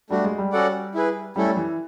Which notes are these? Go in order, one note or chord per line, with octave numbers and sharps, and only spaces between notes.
G3 A3 D4 F#4
G#3
G3
C#4 F#4 A4 D5 F#5
E4 G#4 B4
G3 A3 C#4 E4 A4
E3